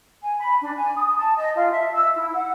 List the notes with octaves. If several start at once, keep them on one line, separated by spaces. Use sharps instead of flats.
G#5
B5
D4
G#5
D#6
A5
D#5
F4
E5
E6
E4
F#5